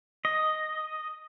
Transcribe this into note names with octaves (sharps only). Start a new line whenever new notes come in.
D#5